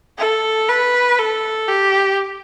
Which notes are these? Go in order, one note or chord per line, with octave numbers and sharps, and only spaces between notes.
A4
B4
A4
G4